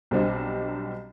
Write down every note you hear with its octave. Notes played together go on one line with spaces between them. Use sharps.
B1 F#3 G3 C4 D4 D#5